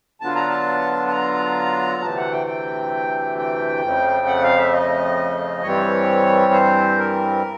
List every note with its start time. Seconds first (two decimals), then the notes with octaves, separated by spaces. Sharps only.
0.21 D3 F#3 B3 D4 F4 A5
0.35 A#5
0.49 A5
1.07 A5
1.12 A#5
2.02 D2 C3 E3 A3 A5
2.17 F#5
2.32 G5
2.47 G5
3.38 G5
3.82 F2 C#3 F3 A3
4.27 F#5
4.43 F5
4.58 E5
4.73 D#5
5.63 G2 E3 G3 C4 C#5
6.53 C5
6.98 A#4